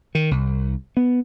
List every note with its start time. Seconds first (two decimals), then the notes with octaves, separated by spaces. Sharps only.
0.15 D#3
0.31 C2
0.97 B3